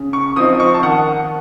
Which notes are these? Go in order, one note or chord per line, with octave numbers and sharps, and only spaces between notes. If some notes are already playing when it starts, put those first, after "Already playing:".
Already playing: C#3
C#6
F3 C4 D#4 D#6
C#6
A5
D#3 F#5